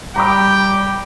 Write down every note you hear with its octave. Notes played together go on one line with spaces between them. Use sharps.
G3 G4 G5 A#5 B5 D6